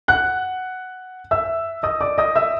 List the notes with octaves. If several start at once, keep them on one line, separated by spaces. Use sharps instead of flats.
F#5 F#6
E5 E6
D#5 D#6
D5 D6
D#5 D#6
E5 E6